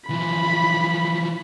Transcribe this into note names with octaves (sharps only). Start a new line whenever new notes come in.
E3 F3 B5